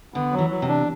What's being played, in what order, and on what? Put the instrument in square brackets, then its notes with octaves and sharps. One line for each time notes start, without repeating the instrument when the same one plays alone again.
[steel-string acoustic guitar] D3 [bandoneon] B3
[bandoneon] F#3
[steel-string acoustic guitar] E3
[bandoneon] F#3
[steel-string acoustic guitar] C3
[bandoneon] D4